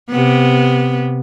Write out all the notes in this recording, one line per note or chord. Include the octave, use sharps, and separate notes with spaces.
C3 B3